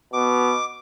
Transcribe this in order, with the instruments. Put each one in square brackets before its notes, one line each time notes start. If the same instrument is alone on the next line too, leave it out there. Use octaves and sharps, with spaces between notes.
[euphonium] B2 [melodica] D6